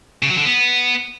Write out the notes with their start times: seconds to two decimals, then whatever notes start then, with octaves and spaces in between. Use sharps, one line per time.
0.23 C#3
0.30 F#3
0.38 D3
0.45 B3